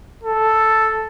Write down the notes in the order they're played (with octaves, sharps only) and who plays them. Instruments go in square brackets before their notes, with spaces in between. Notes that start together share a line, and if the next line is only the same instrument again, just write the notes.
[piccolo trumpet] A4